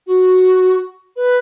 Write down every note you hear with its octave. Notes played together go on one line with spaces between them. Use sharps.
F#4
B4